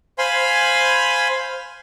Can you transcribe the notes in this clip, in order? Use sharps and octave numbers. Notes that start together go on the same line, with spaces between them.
C5 F5 G#5 B5 C6